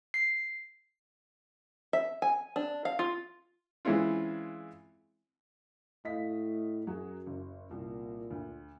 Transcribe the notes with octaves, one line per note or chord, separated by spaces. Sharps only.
C7
E5
G#5
D4
F5
F4
E3 G#3 C4 C#4 E4 F4
A2 D#5 F5 B6
F#2 F#3 F#4 G#4
F#1
C2 A#2
D2